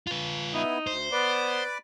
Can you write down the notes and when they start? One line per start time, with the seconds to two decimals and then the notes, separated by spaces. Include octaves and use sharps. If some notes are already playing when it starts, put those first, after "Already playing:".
0.07 F4 B4
0.54 B3 D#4 E4
0.87 D2 C5
1.12 B3 B4 D5 D6